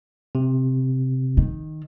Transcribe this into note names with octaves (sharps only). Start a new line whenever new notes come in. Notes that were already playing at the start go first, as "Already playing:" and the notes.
C3
D#3